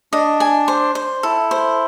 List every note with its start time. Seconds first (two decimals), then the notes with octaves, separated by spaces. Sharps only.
0.13 D4 D#5
0.40 G#5
0.68 C5
0.95 C5
1.23 E4 A4
1.51 C5